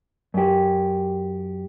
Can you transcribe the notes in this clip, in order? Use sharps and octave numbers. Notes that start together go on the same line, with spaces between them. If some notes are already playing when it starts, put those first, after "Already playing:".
F#2 G4